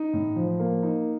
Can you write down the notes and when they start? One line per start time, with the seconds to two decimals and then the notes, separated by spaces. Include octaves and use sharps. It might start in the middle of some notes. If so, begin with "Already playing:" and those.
Already playing: D#4
0.13 A2
0.36 F3
0.60 A#3
0.83 D#4